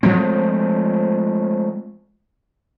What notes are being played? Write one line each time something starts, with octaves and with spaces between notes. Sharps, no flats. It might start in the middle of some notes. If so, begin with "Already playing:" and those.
F3 G#3 A3 C4